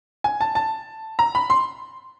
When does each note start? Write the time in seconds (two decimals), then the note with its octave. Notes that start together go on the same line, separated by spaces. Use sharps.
0.24 G#5
0.41 A5
0.55 A5
1.19 A#5
1.35 B5
1.50 C6